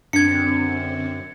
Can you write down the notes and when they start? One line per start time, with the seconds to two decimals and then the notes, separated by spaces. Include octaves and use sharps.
0.13 F#2 D3 C4 D4 G#6 C#7